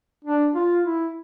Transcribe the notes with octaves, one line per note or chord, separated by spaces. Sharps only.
D4
F4
E4